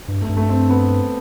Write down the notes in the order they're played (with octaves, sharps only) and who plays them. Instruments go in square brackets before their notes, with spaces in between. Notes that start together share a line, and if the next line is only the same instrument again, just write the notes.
[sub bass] G2
[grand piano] A3
[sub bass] G2
[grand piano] A3
C4
B3